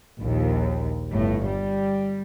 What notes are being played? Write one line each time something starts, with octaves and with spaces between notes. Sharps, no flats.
A#1 D#2
G1 A2
G3